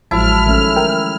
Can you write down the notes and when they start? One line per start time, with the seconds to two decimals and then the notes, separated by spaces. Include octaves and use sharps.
0.11 A1 F3 F#3 G#3 E4 A5 F6
0.46 D#3 A3 C#4
0.76 A#4 G5